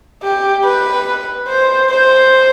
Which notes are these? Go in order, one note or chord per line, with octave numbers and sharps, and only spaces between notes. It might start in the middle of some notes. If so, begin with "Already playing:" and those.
G4
B4
C5
C5